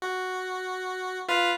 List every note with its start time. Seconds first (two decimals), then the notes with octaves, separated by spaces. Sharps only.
0.02 F#4
1.28 F4 B4 F5